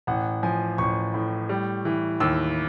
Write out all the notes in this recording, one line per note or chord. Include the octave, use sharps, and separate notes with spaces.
A1 F#5
F3 G#5
A1 C#6
A2
G3
E3
D#2 E6